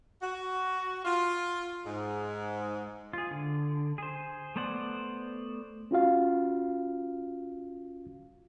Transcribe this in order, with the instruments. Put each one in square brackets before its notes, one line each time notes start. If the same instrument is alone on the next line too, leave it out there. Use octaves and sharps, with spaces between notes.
[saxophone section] F#4
F4
G#2
[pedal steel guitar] F4 G#4
D3
G#4 C5
A3 B3 C5 D5 F#5
[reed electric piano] C#4 F4 F#4 F5